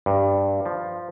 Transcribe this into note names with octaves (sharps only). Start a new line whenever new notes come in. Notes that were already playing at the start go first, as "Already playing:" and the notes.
G2
F3